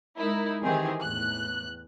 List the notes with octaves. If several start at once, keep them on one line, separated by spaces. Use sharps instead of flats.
G#3 D#4 E4 A#4
D#3 E3 C4 G4 G#4
E2 A2 F#6